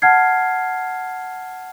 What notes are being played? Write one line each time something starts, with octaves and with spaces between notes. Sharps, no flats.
F#5 A5 F6 G#6 C7